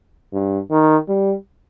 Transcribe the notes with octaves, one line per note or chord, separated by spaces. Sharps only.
G2
D#3
G3